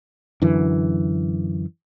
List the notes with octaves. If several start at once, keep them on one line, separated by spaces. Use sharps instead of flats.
F#2 D3 E3